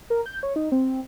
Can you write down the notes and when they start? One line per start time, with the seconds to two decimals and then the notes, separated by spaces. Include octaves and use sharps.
0.10 A#4
0.26 G6
0.43 C#5
0.56 D#4
0.72 C4